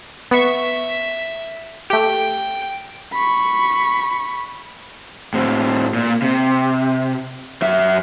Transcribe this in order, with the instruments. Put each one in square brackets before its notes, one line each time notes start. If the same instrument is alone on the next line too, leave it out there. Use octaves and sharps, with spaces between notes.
[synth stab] B3 C#6 [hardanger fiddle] E5
[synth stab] A3 G4 [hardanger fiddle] G5
[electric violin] B5 C#6
[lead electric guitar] A2 C4
A#2
C3
F#2 E5